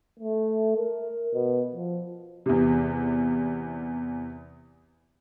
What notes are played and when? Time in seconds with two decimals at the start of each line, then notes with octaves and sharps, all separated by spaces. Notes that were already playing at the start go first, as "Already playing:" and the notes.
0.19 A3
0.77 A#4
1.34 B2
1.75 F3
2.46 E2 C3